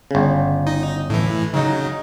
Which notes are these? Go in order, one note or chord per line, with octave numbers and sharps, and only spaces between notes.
G1 C#3
D#4
A2 E3
C#3 F#3 D#4